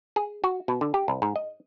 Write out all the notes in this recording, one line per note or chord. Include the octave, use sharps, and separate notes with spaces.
G#4
F#4
B2
D3
G4
C2
G#2
D#5